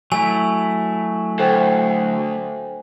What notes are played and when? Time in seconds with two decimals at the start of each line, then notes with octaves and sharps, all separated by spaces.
0.12 F#3 A3 E4 G#5
1.39 D2 A4 C5 G5